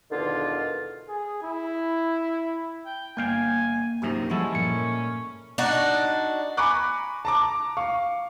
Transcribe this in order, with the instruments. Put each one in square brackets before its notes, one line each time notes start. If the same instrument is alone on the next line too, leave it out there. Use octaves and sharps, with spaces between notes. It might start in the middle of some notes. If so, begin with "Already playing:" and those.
[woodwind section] E2 B2 D3 D#3 F4
[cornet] G#4
E4
[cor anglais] G5
[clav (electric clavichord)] G1 F5 G5 [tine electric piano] A#3 [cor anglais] G#5
[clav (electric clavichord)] A#1 F#2 C3 [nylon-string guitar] D#4 F4 G4
[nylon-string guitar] F3 G3 F#5 [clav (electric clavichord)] G#3 E4 A4 [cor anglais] C#4
[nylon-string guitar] A#2 [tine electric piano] C#7
[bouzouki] D4 D#4 F#4
[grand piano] G#5 A#5 B5 C#6 D6 F#6
A5 A#5 D6
F5 C#6